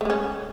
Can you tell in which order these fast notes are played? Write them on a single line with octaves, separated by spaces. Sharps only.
A3 G#3 C#4